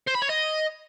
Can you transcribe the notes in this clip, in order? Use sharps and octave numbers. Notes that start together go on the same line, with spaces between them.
C5
B5
C#5
D#5